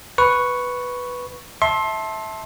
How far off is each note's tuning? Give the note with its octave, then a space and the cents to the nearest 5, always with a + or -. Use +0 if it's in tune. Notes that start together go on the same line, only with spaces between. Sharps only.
B4 +0 C#6 +0
E5 -15 A5 +0 C6 +25